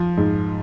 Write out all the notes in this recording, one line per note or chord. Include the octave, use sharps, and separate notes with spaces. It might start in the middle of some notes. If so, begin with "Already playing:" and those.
Already playing: F3
G#2